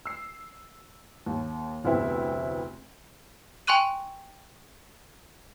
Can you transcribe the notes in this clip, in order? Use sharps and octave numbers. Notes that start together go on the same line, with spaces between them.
E6 C7
D#2
F1 D2 B3 C4 E4
G5 G#5 C6 C#6 F#6 D#7